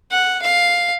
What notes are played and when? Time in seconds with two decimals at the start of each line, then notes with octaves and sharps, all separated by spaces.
0.11 F#5
0.42 F5